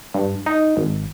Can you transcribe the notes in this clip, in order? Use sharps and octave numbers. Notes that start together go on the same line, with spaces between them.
G2
D#4
G#1